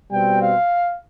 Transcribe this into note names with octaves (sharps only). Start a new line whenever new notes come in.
B2 G3 C4 G5
F5